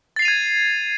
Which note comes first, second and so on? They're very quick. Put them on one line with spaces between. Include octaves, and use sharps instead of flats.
A6 C7 F7 D#7 G#6